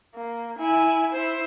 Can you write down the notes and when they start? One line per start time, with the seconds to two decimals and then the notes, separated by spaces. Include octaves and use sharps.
0.14 A#3
0.58 E4 G#5
1.12 E4 C5